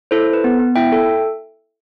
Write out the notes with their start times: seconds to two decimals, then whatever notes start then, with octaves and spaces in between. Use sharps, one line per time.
0.11 E4 A4 C5
0.27 A4
0.33 B4
0.44 B3
0.59 B3
0.76 E4 E5 G5
0.92 A4